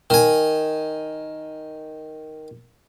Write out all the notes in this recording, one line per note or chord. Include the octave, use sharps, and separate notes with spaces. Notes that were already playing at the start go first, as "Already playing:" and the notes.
D#3 G#5